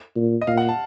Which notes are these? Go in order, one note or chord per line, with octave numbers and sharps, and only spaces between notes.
A#2
D#5
A#2 F5
F#5
A5